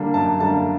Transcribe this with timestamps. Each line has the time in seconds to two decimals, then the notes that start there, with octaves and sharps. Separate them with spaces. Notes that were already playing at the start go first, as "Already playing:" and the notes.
Already playing: D3 G3 A#3 D4
0.14 F#2 A5
0.40 D3 G3 A#3 D4 A5